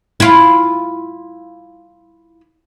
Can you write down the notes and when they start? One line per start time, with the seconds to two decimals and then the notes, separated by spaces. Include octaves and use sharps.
0.20 E4 F4